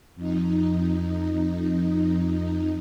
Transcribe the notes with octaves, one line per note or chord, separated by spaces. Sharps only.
F2 D#4